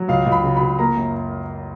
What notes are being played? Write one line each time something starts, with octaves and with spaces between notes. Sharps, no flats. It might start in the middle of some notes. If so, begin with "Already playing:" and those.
Already playing: F#3
C#2 F5
C#2
B5
C#3
C#2 B5
A#3 A#5
F#2